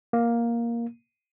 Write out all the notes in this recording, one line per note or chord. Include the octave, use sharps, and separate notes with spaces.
A#3